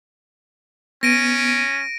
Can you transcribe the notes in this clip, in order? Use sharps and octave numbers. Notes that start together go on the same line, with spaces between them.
B3 C#4 A#6 D7 D#7